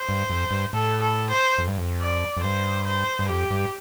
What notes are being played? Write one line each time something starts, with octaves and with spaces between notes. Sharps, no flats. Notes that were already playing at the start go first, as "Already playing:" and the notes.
Already playing: C5
G2
F2
G2
A2 A4
A4
C5
F2
G2
F2
D5
F2
G2 C5
C5
G2
F2 G4
G2